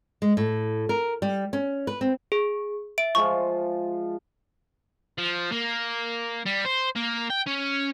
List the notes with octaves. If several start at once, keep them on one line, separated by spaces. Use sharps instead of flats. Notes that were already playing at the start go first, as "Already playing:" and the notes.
G#3
A2
A#4
G3
C#4
B4
C4
G#4
E5 D7
F3 G#3 F4 C#6
F3
A#3
G3
C5
A#3
G5
C#4